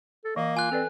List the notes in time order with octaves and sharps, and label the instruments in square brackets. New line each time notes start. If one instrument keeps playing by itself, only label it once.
[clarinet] A4
[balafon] E3 [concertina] A#3 [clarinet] D#5
[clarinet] F4 [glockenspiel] G#5 F#6
[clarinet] C4 [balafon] A4 B4 D5